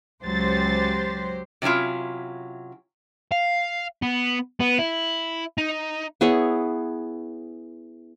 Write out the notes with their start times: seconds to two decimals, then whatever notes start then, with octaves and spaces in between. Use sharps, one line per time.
0.23 C#2 F#3 G4 C5 A6
1.62 C3 F#3 C#4 E4 F4
3.32 F5
4.02 B3
4.60 B3
4.78 E4
5.58 D#4
6.21 B3 E4 G#4 C#5